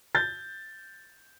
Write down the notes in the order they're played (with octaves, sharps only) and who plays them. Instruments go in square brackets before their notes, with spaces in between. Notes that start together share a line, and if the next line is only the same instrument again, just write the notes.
[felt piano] G6 A6